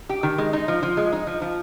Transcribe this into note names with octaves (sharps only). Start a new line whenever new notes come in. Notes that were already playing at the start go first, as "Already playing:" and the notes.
G4
D#3
G#3
D#4
F3
F3
G#3
D#4
F3
F3